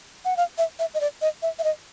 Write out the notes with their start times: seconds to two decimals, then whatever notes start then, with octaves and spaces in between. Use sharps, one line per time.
0.25 F#5
0.37 F5
0.58 E5
0.79 E5
0.94 D#5
1.01 D5
1.22 D#5
1.42 E5
1.59 E5
1.64 D#5